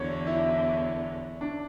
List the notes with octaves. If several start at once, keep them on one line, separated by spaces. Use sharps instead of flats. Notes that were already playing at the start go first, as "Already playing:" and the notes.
Already playing: E2 D3 F#3 C#5
E4
D4